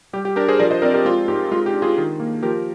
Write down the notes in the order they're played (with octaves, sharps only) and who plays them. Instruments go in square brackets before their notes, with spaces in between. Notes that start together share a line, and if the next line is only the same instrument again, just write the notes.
[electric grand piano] G3 G4
G4
D4 G4 A#4
G#4 C5
F3 A#4 D5
C5 D#5
C4 A#4 D5
G4 A#4
G#3 F4
G#2 G4
G#3 F4
G4
D4
F4 G#4
D#3
A#3
F3 G4 A#4